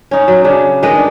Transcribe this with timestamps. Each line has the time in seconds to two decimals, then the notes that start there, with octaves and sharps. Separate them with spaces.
0.11 C#4 D#4
0.28 F#3
0.44 C#3 D4
0.83 D#3 G#3 B4 D#5
0.96 D4